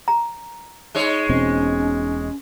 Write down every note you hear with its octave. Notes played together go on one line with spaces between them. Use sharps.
A#5
G#3 D#4 C#5
E1 B2 C4 C#4